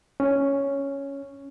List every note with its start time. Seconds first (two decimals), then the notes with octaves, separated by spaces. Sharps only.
0.20 C#4